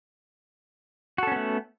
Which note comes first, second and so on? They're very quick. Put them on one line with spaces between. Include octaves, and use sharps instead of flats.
F#4 A4 C#4 B3 A3